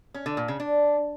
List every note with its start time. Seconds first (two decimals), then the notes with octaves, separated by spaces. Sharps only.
0.14 C#4
0.26 D3
0.37 A#2
0.48 C#3
0.60 D4